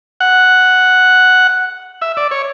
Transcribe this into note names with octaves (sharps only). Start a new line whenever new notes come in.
F#5
E5
D5
C#5